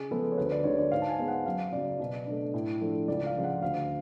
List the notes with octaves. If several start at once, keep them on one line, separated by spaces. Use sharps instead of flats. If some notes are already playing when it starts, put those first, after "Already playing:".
Already playing: C#3 G#4
F3 G#3 B3 A4
C#5
D2 B4
D5
D3 G#3 D4 C#5
D5
G#2 F5
A5
G#5
G#3 B3
F#5
F#2 F5
C#3 F#3 D5
B2
A3 D4
A2
F3 A3 D4
C#2 D5
F5
C#3 F3 G#3
F#5
D2 F5